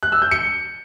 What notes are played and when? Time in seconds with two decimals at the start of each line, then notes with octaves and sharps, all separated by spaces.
0.03 F#6
0.12 E6
0.22 G6
0.31 C#7